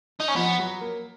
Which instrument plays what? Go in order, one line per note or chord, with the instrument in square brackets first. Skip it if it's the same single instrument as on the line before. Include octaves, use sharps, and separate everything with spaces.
[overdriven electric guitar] D#4
C#4
[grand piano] F3 [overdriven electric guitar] B3
[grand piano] F#3
A#3